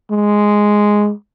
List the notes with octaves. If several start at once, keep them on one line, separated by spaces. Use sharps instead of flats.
G#3